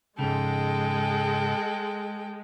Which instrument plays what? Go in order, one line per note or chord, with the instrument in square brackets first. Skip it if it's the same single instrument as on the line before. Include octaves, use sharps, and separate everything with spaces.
[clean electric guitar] G#2 C#3 [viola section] G#3 [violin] A4 G5